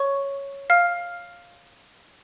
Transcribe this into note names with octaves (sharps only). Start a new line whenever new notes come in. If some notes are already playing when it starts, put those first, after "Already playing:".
Already playing: C#5 C#6
F5 F6